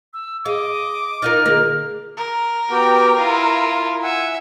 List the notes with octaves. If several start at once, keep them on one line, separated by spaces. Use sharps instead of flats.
E6
G#4 D#5 F5 D6
D#4 F4 A#4 F6 A6
D3 A#3 G#4 A#4
A#4
B3 F#4 G4 G5
E4 F4 A#5 D#6
E5 F#5 G#5